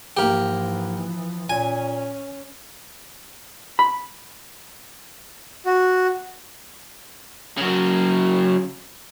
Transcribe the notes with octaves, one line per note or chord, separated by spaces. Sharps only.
G#2 E3 F3 A#3 G4
A#2 C#4 G#5
B5
F#4
C#3 F#3